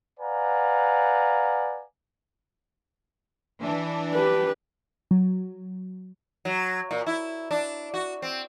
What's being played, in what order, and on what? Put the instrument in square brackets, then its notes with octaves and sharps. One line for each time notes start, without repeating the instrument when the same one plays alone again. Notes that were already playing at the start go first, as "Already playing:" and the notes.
[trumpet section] B4 D5 F5 F#5 G#5 A#5
[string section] E3 D4
[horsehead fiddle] G4 B4
[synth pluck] F#3
[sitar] F#3
A#2
E4
D4
F#4
C4